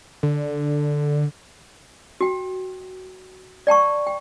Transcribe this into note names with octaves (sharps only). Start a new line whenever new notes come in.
D3
F#4 G5
D5 G5 A5 C#6
G5